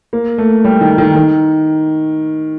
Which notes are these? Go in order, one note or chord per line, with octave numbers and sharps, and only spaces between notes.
A#3
A3
G3
D#3
D#3
D#3